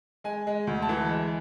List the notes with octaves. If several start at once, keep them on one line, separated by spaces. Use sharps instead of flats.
G#3 G#5
G#3
D2
A5
E3
G#3